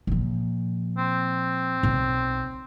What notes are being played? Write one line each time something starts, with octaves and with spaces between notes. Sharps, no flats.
A#2 F3
C4
B1